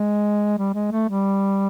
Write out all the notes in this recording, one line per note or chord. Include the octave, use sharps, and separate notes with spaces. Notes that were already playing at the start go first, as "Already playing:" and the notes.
Already playing: G#3
G3
G#3
A3
G3